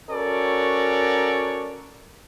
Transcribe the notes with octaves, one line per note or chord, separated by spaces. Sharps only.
C#4 F#4 A4 A#4 C#5 D5